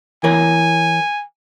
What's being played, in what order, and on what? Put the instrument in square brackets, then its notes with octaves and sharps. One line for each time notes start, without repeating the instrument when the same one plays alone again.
[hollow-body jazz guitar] E3 A#4 C#5 [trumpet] G#5